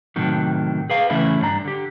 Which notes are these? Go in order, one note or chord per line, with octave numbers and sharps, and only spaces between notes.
A2 C3 D#3 F#3
G#4 B4 F5
C#3 E3 A3 C#4 E4
G2 D4 A#5
D3 G4